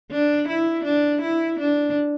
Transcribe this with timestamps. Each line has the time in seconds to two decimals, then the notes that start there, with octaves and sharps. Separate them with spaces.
0.11 D4
0.48 E4
0.84 D4
1.22 E4
1.59 D4